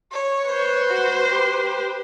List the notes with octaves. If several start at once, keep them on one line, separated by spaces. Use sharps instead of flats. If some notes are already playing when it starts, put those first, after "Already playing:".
C#5
B4 C5
F#4
G4